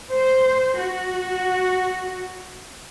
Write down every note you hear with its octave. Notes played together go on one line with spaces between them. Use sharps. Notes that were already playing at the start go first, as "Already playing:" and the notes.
C5
F#4